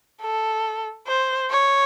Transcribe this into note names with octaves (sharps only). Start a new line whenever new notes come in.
A4
C5
C#5